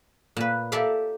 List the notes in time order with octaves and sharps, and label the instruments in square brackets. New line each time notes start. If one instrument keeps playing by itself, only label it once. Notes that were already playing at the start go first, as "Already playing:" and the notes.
[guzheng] A#2 B4
G4 A4 A#4 D5 E5 F5